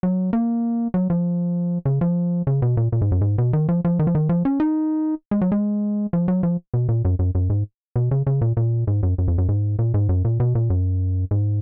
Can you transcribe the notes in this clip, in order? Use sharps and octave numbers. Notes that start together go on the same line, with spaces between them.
F#3
A#3
F#3
F3
C#3
F3
C#3
B2
A#2
A#2
G#2
F#2
G#2
B2
D#3
F3
F3
D#3
F3
D#3
F3
C#4
D#4
G#3
F#3
G#3
F3
F#3
F3
B2
A#2
F#2
F#2
F#2
G#2
B2
C#3
C#3
A#2
A#2
G#2
F#2
F#2
F2
F#2
G#2
A#2
G#2
F#2
A#2
B2
A#2
F#2
G#2